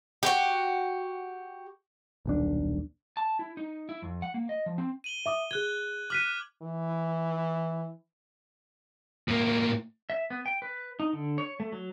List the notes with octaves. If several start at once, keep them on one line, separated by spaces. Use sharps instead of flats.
F#4 G4
D#1 B1 D4
A5
E4
D#4
E4
F2
F#5
A#3
D#5
F3
C4
D#7 F#7 G7
E5 D6 D#6
G#4 F#6 G#6 G7
D6 F6 F#6 B6 D#7 F#7
E3
A2 A#3
E5
B3
G5
B4
D#4
D3
C#5
A3
F#3